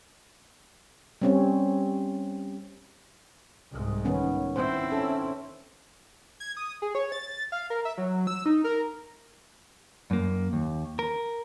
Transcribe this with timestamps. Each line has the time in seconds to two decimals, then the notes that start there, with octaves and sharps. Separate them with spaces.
1.22 G3 C4 C#4
3.72 C2 G#2
4.05 D#3 B3 C#4
4.56 C4 E4 C5
4.92 C#4 A4
6.40 G#6
6.57 D#6
6.82 G#4
6.95 C#5
7.12 A6
7.52 F5
7.70 A#4
7.85 E5
7.98 F#3
8.27 E6
8.46 D#4
8.64 A#4
10.11 F#2 A#3
10.53 D#2
10.99 A#4